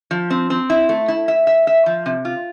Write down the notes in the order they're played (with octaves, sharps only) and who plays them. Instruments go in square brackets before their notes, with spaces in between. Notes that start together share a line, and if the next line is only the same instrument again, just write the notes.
[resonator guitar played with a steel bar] F3
C4
C4
E4
A3
E4
E5
E5
E5
F3
C3
F4